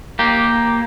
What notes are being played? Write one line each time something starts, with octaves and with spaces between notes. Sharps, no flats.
A#3 G4